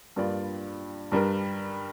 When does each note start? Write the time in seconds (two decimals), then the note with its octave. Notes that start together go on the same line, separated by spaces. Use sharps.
0.16 G2 G3 A#3 F4 D5
1.12 G2 G3 D4 A#4